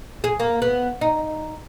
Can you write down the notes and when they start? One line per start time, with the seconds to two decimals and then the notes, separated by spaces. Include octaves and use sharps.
0.24 G#4
0.40 A#3
0.62 B3
1.01 D#4